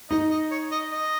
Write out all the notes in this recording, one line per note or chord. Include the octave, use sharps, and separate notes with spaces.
D#4 D#5
D#5
C#5
D#5
D#5